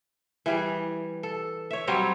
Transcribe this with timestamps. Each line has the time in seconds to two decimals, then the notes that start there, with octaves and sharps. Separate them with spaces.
0.46 E3 G3 G#4
1.23 A4
1.71 C#5 E5
1.87 F#3 G3 C4 C#5